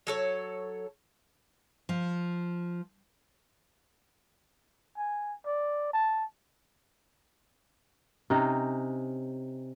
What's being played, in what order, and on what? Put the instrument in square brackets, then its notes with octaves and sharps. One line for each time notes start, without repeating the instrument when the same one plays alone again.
[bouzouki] F#3 A4 C#5
[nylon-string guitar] F3
[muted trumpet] G#5
D5
A5
[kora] C3 C#4 D#4